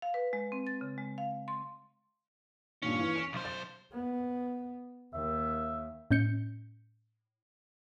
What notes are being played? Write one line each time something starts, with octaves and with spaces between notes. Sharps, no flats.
F5
B4
G#3
C4
A6
C#3
G#3
F5
C6
G2 A#2 D#3 C#4
E3
D7 E7
B1 C5
A6
B3
D#2 D#3 E5
A2 C#4 G6 C#7